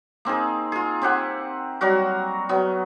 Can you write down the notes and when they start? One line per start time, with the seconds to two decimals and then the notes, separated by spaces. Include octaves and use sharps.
0.25 A#3 C4 D#4 G#4
0.72 F4 G#4
1.02 C4 G4 F#5 G#5
1.81 F#3 G3 F#4 A#4
2.49 F#3 B3